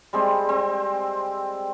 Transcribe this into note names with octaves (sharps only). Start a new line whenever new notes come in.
G3 G#3 C4
C4